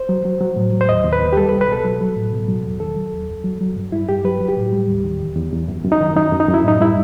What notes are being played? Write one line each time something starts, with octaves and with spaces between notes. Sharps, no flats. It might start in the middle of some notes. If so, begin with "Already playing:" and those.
Already playing: C5
F#3
F#3
F#3
A2
F#3
C5
D#2 D#5
D#2
B4
D#2
G4
G3 A4
B4
C2
B4
B2 A4
F#3
F#3
A2
B2
F#3
E2
D#3 A4
F#3
D#2
F#2
F#3
F#3
G2
G2 E4
G2 G4
F#3 B4
F#3
G4
A2
G3
D#2
D#3
E2
E2
E2
F#2
F#2
D#4
D#3
F#2 D#4
F#2
D#4
F#2
E4
A2 D#4
G3 E4